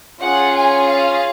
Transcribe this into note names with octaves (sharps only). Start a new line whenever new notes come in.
C#4 F4 G#4 F#5
G#5
F5